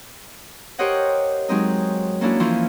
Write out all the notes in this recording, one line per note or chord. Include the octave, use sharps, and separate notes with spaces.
G4 A#4 C5 C#5 D#5 F#5
F#3 G#3 C4 D#4
A#3 C#4 D4 E4 F#4
E3 F3 C#4 E4 F4